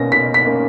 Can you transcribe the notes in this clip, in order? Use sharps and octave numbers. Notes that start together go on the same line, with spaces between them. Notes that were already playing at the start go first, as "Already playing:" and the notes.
Already playing: B2 A#3 C#4 A#6
B2 B6
B6
A#3 C#4